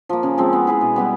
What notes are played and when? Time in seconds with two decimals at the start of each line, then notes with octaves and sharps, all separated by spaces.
0.09 F3 A#3
0.23 C#3
0.38 F3 G#3 C4
0.53 B3
0.67 E4 G#4 B4
0.81 B2
0.96 G3 B3 E4